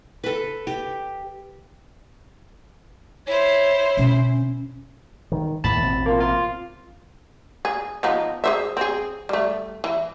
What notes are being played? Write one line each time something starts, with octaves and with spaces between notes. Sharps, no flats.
A4 B4
G4
E4 C5 C#5
B2 D3 C#4
D#3
D#2 A2 A5 B5 A6
A1 B2 C4
A#3 F4
F4
G#4
F3 B3 D#4
G#4 C5 E5
C4 G#4
G3 A3
E3